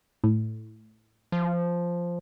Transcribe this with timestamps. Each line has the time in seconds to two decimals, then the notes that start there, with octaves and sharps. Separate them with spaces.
0.24 A2
1.32 F3